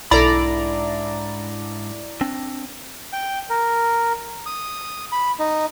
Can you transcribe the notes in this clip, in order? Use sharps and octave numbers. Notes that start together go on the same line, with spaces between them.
B1 G#2 D4 E4 A4 D5 A#5 B5
C4 D4
G5
A#4
D#6
B5
D#4